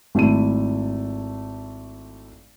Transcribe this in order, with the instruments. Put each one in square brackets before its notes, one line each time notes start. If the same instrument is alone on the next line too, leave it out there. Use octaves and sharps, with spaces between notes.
[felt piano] G#1 A3 E4 D#7